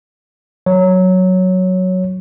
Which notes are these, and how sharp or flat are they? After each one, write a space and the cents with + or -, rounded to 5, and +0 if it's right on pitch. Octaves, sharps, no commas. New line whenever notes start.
F#3 +0 C#5 +0